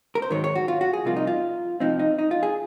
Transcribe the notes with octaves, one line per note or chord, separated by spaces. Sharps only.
A#4
C5
G#2 D#3 F#3 C#5
C#5
F#4
F4
F#4
G#4
C2 C3 F3 A#3 F4
D#4
F4
C3 F3 C4 D#4
D#4
D#4
F4
G#4